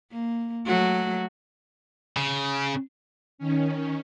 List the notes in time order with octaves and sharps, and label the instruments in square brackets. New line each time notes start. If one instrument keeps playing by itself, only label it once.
[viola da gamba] A#3
F#3 A3 F#4
[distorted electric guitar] C#3
[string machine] D#3 C#4